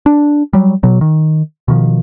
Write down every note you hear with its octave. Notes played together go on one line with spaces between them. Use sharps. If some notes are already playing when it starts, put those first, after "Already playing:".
D4
F#3 G3
B2 F#3
D#3
B2 D#3 F3